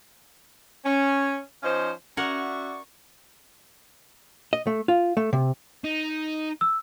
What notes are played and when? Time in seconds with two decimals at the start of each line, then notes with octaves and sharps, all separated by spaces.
0.85 C#4
1.63 F3 C#4 D#4 C5 F5
2.17 C#4 F#4 A#4 D5 E5 F#5 C#6
4.53 D#5
4.67 A3
4.88 F4
5.17 A3
5.33 C3
5.84 D#4
6.61 E6